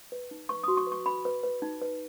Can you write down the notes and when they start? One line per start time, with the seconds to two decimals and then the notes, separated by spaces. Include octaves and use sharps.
0.12 B4
0.31 D#4
0.49 B4 C#6
0.64 F#4 D#6
0.77 C#6
0.87 B4
0.92 C#6
1.06 B4 B5
1.25 B4
1.43 B4
1.62 D#4
1.82 B4